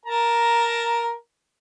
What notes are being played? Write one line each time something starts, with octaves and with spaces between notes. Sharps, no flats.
A#4 A5 A#5